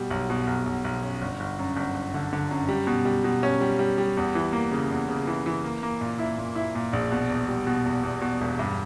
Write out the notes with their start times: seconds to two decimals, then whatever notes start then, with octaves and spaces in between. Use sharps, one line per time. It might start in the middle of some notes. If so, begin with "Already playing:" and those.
Already playing: B2 G3
0.10 B1
0.30 B2
0.47 B1
0.66 B1
0.84 B1
1.02 C#4
1.22 G1
1.40 G1
1.59 F#2
1.77 G1
1.95 G1
2.14 D3
2.33 D3
2.51 F#2
2.68 G3
2.87 B2
3.05 G3
3.24 B2
3.43 C#4
3.61 G3
3.79 G3
3.98 G3
4.17 E2
4.35 E3
4.53 A#3
4.72 C#3
4.91 E2
5.09 C#3
5.27 E3
5.46 E3
5.64 A#3
5.83 A#3
6.01 A#2
6.19 E4
6.38 A#2
6.55 E4
6.75 A#2
6.93 A#1
7.11 B2
7.30 E2
7.49 G3
7.67 B2
7.85 E2
8.03 E2
8.21 B2
8.41 E1
8.59 G2